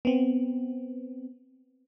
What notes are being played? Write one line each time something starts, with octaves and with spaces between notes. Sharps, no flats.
B3 C4